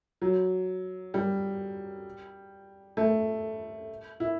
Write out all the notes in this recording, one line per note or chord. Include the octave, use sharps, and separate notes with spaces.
F#3
G3
A3
E4